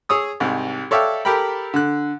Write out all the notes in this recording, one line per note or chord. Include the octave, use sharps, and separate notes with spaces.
G#4 C#5 D#6 E6
C2 G#2
A4 C#5 D5 E5 F5 G5
G4 A4 A#4 G5 B5
D3 F#6